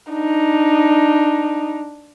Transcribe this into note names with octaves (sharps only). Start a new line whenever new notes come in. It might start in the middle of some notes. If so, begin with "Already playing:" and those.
D4 D#4